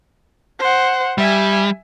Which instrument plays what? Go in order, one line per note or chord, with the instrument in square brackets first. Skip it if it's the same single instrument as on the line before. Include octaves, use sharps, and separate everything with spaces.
[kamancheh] C5 F#5
[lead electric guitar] G3 [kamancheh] E5 G#5